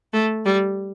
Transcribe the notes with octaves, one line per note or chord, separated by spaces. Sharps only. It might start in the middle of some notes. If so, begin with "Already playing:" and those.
A3
G3